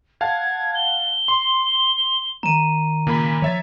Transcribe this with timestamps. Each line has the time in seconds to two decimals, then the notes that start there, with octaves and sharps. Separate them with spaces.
0.21 F5 F#5 A5 G#6
0.75 G7
1.28 C6
2.43 D#3 A#5 D#7
3.07 A#2 C#3 A#3 B5
3.42 F3 C#5 E5 A6